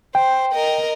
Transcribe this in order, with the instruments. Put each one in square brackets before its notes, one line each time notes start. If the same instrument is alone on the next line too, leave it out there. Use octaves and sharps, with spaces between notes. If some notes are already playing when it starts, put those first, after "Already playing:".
[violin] C5 [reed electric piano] G5
[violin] A#4 D#5